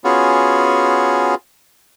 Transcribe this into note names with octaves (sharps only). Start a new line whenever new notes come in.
B3 C#4 F4 F#4 G#4